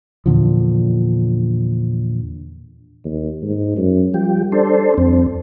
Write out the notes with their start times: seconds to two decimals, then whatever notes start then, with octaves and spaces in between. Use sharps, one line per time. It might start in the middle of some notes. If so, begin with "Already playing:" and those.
0.26 E2 A#2 D3 F3
3.05 D#2
3.43 G#2
3.77 F#2
4.14 F3 G3 G4
4.52 D4 A4 C5
4.98 F2 C4